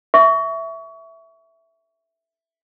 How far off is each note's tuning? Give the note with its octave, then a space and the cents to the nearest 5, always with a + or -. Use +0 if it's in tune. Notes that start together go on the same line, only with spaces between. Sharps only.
E5 +0 C#6 +25